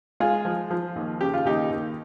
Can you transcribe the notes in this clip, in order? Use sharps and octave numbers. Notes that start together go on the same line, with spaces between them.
G#3 F4 G#4
F3
F3
D#2
C#3 G4
F4
D#2 D#4 G4
D#2